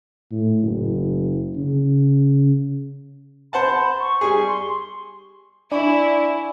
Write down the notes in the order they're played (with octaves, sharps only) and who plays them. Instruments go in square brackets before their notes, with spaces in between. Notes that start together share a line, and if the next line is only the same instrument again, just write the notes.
[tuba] A2
F#1
C#3
[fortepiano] C5 F#5 A5 [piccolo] B5
[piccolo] C#6
[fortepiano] G3 G#4
[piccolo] C6
[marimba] D4 [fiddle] E4 [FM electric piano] D5 [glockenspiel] G#5 B5 C#6